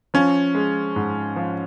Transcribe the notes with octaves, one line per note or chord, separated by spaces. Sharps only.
F3 C#4
G#3
G#2
F3